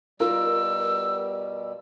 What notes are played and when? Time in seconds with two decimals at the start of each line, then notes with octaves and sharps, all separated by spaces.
0.20 B2 G3 F4 A#4 E6